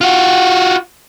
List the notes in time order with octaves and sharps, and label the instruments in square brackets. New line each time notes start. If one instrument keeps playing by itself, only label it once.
[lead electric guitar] F4 F#4